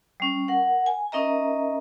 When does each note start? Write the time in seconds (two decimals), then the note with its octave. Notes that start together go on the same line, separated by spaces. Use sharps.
0.20 G3 C#4
0.48 A#4 F#5
0.86 G#5
1.12 C#4 D#4 A#4 D#5 E5 A#5